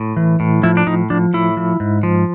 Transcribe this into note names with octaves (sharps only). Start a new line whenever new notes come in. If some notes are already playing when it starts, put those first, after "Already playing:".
Already playing: A2
E3
A2
F3 E4
D4
A2 D#4
F3 D4
A2 E4
F3
G#2
F3